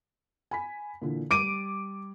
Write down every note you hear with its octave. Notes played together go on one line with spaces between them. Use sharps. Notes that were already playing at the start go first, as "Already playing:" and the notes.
G#5 B5 B6
A#2 D3 E3
G3 D6 D7 D#7